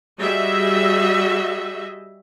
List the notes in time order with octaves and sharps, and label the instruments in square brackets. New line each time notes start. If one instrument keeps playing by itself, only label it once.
[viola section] G3 F#4 G#4 D#5 E5